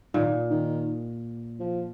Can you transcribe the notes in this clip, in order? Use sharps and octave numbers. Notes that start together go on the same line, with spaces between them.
A#2 D#3
D#3
F3